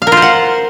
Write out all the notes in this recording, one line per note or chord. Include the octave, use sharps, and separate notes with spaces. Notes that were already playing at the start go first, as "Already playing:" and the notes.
F5
A#4
F4
C5
F#5